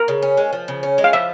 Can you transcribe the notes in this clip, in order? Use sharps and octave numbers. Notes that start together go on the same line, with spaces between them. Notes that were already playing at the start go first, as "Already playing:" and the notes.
Already playing: A#4
C#3
C#4
G#3
F3
C#3
C#4
G#3
F5
F3 E5